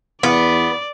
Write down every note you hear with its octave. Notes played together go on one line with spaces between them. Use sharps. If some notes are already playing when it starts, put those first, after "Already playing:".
E2 B3 D5